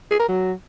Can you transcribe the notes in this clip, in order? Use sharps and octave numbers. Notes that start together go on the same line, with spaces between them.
G#4
A#4
F#3